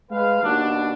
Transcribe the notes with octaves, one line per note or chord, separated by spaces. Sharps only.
G#3 B4 F5
D#2 B2 D4